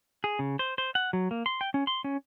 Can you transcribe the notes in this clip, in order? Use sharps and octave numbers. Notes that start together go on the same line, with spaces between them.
G#4
C#3
C5
C5
F#5
F#3
A#3
C6
G5
C#4
C6
C#4